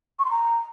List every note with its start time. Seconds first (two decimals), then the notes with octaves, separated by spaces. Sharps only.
0.19 C#6
0.25 C6
0.31 A#5